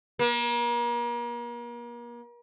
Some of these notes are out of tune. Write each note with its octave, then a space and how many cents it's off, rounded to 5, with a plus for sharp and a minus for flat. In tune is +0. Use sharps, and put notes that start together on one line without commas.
A#3 +40